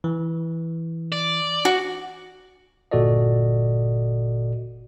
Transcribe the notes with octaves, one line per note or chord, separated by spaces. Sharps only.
E3
D5
F#4
G1 A#2 F#4 A4 D5 D#5